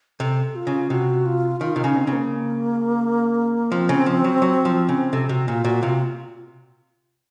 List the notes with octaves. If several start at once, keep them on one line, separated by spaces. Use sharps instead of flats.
C3 A4
F4
C#3
C3 F#4
F4
D#3 F4
C3 D#4
C#3
C4
C#3
A#3
F3 C4
C#3
F3
F#3
F#3
F3
C#3
C3 A4
C3 F#4
A#2 F4
A#2 F#4
C3 F4